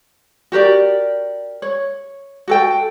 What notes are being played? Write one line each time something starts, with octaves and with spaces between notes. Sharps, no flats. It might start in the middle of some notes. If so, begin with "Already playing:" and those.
F#4 G4 A#4 D5
C#5
F#4 A4 G5